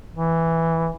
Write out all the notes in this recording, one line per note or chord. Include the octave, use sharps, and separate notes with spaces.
E3